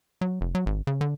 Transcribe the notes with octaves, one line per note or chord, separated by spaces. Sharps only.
F#3
F1
F#3
G#1
C#3
D3